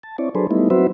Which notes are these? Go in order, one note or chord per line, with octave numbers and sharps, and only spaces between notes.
A5
C4 E4 C#5 D5
F#3 D4 G#4 A4 B4 C5
G3 A3 B3 D#4 E4
F#3 C4 F#4 B4 C5 E5